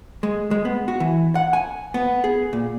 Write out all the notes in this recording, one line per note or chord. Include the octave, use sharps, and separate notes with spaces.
G#3
G#3
B3
F#4
E3
F#5
G#5
B3
G#4
A#2